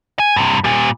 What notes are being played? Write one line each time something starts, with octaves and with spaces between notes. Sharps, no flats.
G#5
G2 C3
A#2 G3